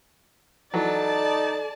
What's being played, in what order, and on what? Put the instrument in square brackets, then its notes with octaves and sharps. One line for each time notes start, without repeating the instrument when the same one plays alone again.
[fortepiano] E3 F#3 [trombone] D#4 [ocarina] A4 [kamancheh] D5 A5